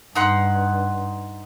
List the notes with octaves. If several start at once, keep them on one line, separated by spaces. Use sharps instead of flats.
G2 D#4 F#5 C6